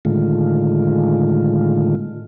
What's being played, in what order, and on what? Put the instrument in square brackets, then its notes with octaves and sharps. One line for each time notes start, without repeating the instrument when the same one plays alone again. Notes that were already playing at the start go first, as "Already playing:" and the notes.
[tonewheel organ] A2 D3 D#3 G#3 A3 F4